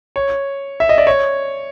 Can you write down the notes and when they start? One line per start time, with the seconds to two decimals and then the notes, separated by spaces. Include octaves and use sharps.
0.16 C#5
0.80 E5
0.89 D#5
0.98 D5
1.07 C#5